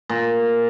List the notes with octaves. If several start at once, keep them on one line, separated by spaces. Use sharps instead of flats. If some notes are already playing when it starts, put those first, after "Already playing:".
A#2